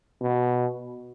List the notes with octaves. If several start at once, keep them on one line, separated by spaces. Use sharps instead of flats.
B2